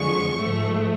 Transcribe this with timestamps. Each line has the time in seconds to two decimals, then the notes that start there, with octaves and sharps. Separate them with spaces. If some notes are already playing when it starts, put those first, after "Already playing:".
Already playing: F2 D3 F3 G#3 C#6
0.38 G#2 F3 A3